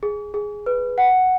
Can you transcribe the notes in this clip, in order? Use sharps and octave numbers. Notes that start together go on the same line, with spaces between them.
G#4
G#4
B4
F#5